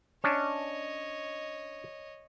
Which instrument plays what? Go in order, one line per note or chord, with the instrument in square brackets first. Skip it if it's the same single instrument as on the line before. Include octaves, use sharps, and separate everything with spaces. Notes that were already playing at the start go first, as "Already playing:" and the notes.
[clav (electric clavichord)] C#4 D4 [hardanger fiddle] C#5 D#5